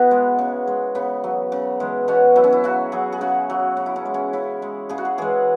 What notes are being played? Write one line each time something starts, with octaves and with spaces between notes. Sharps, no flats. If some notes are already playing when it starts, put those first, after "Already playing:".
Already playing: B2 B3 E4 F#4
G#3
C#3
G#3
C#3 B3
F#3
C#3
E3 G#3
B2 C#4
F#3 E4
C#4
E4
C#3 F#4
F#3 G#4
G#4
C#3 F#4
F#3
C#3
E4
C#4
G#3
C#4
C#3 E4
G#3
C#3 G#4
F#4
G#4
E3 G#3 G#4